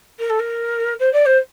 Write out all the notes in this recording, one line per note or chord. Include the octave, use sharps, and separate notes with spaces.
A#4
A4
A#4
C5
D5
C5